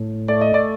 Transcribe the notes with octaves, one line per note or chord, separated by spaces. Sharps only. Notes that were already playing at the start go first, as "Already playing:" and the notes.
Already playing: A2
A3 D5
D#5
D5